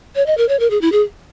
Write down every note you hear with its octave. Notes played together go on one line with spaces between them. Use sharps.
C#5
D#5
A#4
C#5
A#4
G#4
E4
G#4